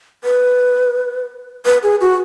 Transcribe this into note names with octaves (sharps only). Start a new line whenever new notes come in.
B4
B4
G#4
F#4